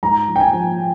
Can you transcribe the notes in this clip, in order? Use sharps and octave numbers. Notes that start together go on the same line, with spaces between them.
G#2 A#5
F3
G5
G#5
F3